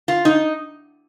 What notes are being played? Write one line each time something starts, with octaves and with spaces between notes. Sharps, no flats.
F4
D#4